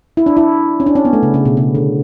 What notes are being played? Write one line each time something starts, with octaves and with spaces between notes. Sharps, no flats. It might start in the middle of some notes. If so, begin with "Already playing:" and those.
E4
D4
E4
C#4
D4
C#4
B3
A3
C#3
C#3
B2
C#3
D3